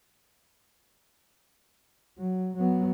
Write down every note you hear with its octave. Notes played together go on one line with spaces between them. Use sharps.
F#3
F#3 B3